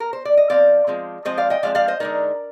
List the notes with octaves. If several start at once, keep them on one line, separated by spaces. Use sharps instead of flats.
A#4
C5
D5
D#5
F3 G#3 C4 D5 F5
F3 G#3 C4
F3 G#3 C4 C5 D#5
D5 F5
D#5 G5
F3 G#3 C4 D5 F5
D5 F5
C5 D#5
D3 G#3 D#4 A#4 D5